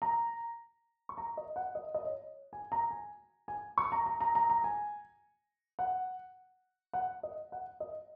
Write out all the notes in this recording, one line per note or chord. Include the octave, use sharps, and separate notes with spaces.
A#5
C#6
A#5
D#5
F#5
D#5
D#5
C#5
G#5
A#5
G#5
G#5
C#6
A#5
A#5
A#5
A#5
A#5
G#5
F#5
F#5
D#5
F#5
D#5